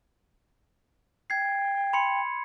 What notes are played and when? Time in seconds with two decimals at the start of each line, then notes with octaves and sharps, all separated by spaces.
1.30 G5 G#6 C7
1.93 B5 C6 C#7